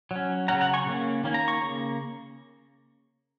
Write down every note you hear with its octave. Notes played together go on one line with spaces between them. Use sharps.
F#3 C#4
C#3 F#3 C#4 F#5 A#5
F#5 A#5
G#5 C#6
C#3 A#3 C#4
D#3 A#3 C#4
A#5
C#6
C#3 A#3